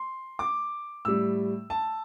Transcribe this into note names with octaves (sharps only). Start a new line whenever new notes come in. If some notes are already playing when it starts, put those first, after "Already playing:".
Already playing: C6
D6
A2 G3 E6
A5